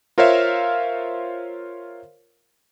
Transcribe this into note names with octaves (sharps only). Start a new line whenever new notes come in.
F4 A#4 C5 C#5 E5 F5